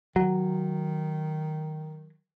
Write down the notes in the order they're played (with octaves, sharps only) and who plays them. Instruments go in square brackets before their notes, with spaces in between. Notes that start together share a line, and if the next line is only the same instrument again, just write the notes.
[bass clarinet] D#3 [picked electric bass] F#3